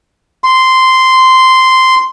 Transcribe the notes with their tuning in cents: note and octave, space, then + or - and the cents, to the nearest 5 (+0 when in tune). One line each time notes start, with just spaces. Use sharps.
C6 -10